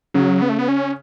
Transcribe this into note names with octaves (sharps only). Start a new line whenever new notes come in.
C#3 F#3
B3
A3
B3
C#4